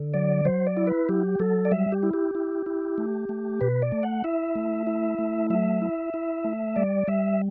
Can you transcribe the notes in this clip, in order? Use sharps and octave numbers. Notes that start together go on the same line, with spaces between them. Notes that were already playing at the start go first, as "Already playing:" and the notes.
Already playing: D3
F#3 D5
F#3 C5
D5
E4
B4
F#3 G4
F#3 A4
D5
G3 E5
G4
E4
G4
E4
E4
A3
A3
B2 B4
D5
A3
F#5
E4 E5
A3
E4
A3
F#3 E5
E4
E4
A3
G3 D5
G3 E5